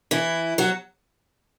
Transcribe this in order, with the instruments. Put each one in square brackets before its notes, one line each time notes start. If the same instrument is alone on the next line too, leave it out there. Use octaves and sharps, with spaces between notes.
[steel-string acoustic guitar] E3 E4
F#3 F#4